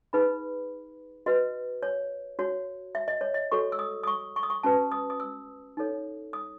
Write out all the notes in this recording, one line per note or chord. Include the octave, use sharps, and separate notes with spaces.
D#4 G#4 B4 B5
F#4 B4 D#5
C#5
F#4 C#5
E5
D#5
C#5
D#5
F#4 A4 C#5 C#6
E6
D#6
D#6
C#6
C#6
D#6
C#6
C#4 F#4 B4 A5
D#6
D#6
E6
D#4 A4 C#5
D#6